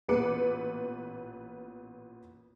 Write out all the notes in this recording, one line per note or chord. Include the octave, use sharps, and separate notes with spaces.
A1 A#2 B3 B4 D6 C#7